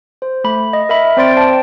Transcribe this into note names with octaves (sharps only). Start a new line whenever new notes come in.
C5
A3 B5
D#5
A#4 E5 B5
C4 C5 D5 C6 A6 D7
C5 D5 G5 A5